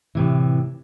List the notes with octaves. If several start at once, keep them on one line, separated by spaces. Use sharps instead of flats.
A2 C3 E3